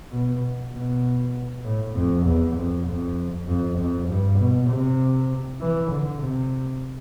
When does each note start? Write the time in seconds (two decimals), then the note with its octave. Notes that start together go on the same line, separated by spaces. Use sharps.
0.12 B2
0.73 B2
1.64 A2
1.95 F2
2.26 E2
2.56 F2
2.86 F2
3.47 F2
3.78 F2
4.08 G2
4.38 B2
4.69 C3
5.61 E3
5.91 D3
6.22 C3